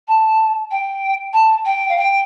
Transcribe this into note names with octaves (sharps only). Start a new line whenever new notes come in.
A5
G5
A5
G5
F5
G5